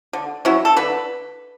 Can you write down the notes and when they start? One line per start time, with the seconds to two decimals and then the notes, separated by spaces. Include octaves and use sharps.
0.13 D3
0.45 F#3 C#4 E4
0.65 A4
0.77 D3 B4